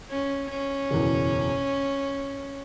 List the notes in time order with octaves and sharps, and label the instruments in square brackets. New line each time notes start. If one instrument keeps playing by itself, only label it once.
[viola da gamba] C#4
C#4
[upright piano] F#1 E2 B2